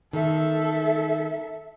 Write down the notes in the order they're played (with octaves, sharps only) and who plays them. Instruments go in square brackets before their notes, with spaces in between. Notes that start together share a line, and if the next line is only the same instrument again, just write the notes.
[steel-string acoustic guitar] D#3 [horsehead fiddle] A4 E5